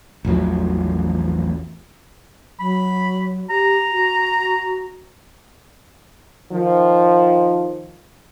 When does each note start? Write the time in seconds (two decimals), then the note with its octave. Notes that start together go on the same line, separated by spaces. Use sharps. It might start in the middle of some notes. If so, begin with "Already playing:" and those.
0.25 A1 E2 F3 F#3
2.60 F#3 B5
3.50 G4 A#5
3.93 F#4
6.51 D#3 F3